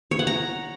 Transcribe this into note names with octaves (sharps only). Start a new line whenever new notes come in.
C#5
F#5
A#5